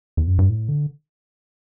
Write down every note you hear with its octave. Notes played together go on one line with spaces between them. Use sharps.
E2
F#2
G2
A2
D3